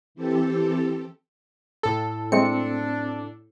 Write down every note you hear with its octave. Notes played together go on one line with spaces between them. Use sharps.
E3 C4 G4 A4
A2 A4 A5
G#3 A3 C4 D4 C#7